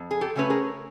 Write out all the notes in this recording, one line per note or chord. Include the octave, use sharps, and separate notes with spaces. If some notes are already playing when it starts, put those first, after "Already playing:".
Already playing: F2
G#4
G4 A4
C#3 F#3 A3 C#4 B4
G#4 A#4